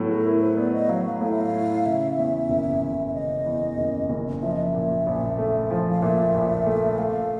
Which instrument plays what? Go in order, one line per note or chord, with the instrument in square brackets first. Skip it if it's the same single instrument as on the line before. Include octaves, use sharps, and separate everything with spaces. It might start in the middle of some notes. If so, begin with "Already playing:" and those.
Already playing: [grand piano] A2 F#3 B3
[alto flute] G#4
A4
[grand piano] E4 [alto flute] A#4
[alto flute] C5
[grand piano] B3 [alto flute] D5
[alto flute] D#5
[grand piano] F#3 [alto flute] F5
[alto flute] F5
[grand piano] A2 [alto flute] F5
[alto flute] E5
F5
[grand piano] E4
[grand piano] C#3 [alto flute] E5
[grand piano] E2
F#1
F#1
[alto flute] E5
[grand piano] C#3 [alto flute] D#5
[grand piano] E2
F#1
F#1
[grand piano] F3 [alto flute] E5
[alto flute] D#5
E5
[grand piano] A#2
A#1
A3
[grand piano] F3 [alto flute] F5
[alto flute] F5
[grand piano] A#2 [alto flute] E5
[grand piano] A#1
A3
[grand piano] A3 [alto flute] F5